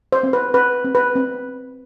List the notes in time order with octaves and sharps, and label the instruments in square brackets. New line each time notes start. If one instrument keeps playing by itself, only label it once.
[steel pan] C5
C4
B4
C4 B4
C4
B4
C4